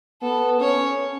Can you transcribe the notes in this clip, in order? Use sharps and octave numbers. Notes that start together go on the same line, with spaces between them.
B3 A4
C#4 C#5